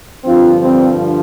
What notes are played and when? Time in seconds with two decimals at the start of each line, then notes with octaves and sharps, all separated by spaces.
0.24 G2 D3 F3 C4 F4
0.61 G3 C4